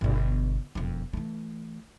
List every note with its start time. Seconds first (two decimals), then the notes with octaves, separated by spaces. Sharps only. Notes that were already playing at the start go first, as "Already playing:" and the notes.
0.01 G1 B2
0.75 E1 F2
1.13 E3 A3